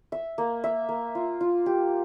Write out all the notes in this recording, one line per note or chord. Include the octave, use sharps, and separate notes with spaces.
E5
A#3
E5
A#3
F4
F4
G4